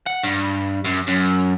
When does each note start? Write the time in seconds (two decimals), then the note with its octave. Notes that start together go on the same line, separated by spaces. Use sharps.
0.07 F#5
0.24 G2
0.85 F#2
1.08 F#2